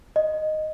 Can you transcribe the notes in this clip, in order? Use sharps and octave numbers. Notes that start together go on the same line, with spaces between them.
D#5